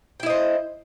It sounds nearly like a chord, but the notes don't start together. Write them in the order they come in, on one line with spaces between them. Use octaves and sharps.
G5 E4 D#5 C5